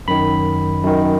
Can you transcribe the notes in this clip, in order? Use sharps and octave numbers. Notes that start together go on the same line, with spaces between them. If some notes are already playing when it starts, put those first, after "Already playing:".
F#2 D#3 B5
F#2 D#3